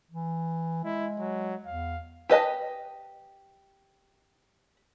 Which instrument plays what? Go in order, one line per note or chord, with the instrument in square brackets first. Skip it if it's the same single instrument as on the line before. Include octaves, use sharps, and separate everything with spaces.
[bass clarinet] E3
[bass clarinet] G#3 [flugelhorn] E4
[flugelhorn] F#3
[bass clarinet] E2 [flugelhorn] F5
[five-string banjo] G4 B4 D#5 A5